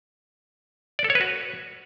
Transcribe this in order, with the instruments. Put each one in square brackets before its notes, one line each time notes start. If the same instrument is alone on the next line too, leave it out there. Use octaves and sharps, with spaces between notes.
[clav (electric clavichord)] D5
A4
C#5
B4
F#4